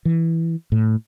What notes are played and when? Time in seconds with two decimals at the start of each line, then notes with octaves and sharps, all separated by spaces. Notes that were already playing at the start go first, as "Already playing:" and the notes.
0.05 E3
0.72 A2